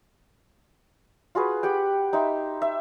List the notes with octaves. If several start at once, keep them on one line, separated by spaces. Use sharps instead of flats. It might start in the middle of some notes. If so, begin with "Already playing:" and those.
F4 F#4 G#4 B4
G4 F#5 G5
D#4 E5 G5 C6
E5